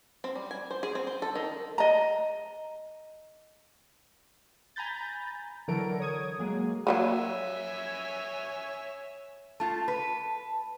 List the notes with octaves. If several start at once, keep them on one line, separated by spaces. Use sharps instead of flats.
C4
G3
G#5
C5
G#4
C4
C5
A4
D#3
D#5 A#5
G#5 A#5 B5 G6 A6
D3 E3 F#3 A4 A#4 D7
C#5 D#6 G#6
F#3 G#3 A#3 G#4
F#3 G3 A#3 C#5 E5 G#5
A3 F4 A5
B4